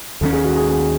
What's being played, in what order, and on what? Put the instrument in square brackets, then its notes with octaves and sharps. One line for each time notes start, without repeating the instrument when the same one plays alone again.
[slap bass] D#2 D#3 F#3 C#4 [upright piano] A4
[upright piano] G#4
F#4
G#4
G#4